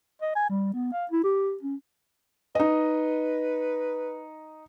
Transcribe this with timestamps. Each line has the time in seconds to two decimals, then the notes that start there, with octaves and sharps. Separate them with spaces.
0.22 D#5
0.35 G#5
0.49 G3
0.74 B3
0.92 F5
1.11 E4
1.24 G4
1.62 C#4
2.55 D#4 B4 D#5